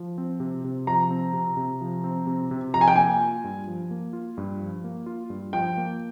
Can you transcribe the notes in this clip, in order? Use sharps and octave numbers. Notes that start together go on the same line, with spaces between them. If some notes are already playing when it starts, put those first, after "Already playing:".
Already playing: F3
C4
C3
C3
F3 A#5
C4
C3
C3
F3
C4
C3
C3
F3 A#5
G#5
G5
A#3 G#5
F4
G2
F3
A#3
F4
G2
F3
A#3
F4
G2
F3 G5
A#3